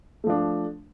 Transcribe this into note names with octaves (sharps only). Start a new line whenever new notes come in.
F3 A3 D4